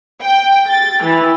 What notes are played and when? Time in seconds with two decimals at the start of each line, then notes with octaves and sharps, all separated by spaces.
0.22 G5
0.70 A6
1.04 E3